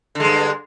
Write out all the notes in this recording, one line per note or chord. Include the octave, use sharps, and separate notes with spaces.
G2 D3 G#3